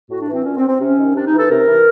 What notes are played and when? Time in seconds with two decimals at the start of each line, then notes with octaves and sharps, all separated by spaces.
0.10 A2 F#4
0.21 D4
0.28 E3
0.33 C4
0.45 A#2 C#4
0.56 C4
0.68 C4
0.80 C3 C#4
0.98 D#3
1.15 C3 D4
1.27 D#4
1.33 E3
1.38 A4
1.50 C3 A#4
1.67 E3